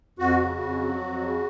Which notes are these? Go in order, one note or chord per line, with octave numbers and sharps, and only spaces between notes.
F2 F#4
C#3
F2
F#3
F2
C#3